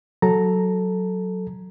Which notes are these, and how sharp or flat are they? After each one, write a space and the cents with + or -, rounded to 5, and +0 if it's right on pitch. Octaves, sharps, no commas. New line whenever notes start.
F#3 +0 A4 +0 A#5 +0